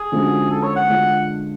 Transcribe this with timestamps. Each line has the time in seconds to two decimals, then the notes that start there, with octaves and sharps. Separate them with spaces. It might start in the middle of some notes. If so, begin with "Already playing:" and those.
Already playing: G#4
0.12 D3 F3 G#3 C#4 F#4
0.50 A4
0.63 C#5
0.76 F#5
0.88 D3 G#3 D4 F4